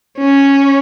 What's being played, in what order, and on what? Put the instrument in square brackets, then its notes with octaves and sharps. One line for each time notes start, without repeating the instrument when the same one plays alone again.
[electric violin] C#4